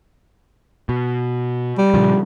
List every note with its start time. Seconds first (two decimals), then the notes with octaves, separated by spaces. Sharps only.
0.89 B2
1.78 G3
1.94 A#2 C#3 F3